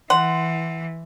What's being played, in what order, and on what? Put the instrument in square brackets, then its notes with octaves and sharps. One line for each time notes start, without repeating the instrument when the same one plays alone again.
[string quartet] E3 [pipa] F#5 [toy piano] C6